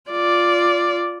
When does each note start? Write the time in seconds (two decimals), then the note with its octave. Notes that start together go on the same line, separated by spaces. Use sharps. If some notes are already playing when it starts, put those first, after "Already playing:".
0.11 F4 D5